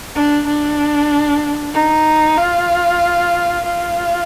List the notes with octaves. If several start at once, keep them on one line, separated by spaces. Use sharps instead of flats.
D4
D4
D#4
F4
F4